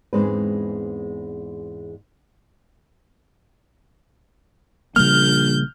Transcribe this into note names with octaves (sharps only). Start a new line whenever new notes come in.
E2 G#2 G#3 C4 D4 B4
A#1 C#3 G3 A#3 F6 G6